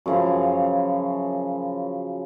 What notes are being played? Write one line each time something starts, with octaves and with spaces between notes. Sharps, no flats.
F#2 C#3 F3